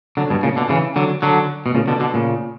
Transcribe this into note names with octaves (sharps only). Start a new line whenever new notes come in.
D3 F#3
G2 B2
A#2 C#3
B2 D3
C#3 E3
D3 F#3
D3 F#3
B2
A#2 C#3
B2 D3
B2 D3
A#2 C#3